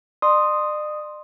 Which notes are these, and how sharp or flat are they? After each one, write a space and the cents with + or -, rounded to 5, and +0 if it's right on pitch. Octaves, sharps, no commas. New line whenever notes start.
D5 +45 C6 +0 D#6 +0